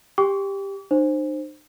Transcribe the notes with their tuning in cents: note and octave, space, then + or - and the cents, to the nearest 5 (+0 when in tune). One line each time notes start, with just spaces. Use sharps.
G4 +10 G5 +15 D6 -40
D#4 -45 C5 +10